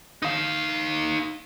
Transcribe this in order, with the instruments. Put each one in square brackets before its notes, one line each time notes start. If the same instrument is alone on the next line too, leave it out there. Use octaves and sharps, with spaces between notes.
[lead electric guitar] D#4 F5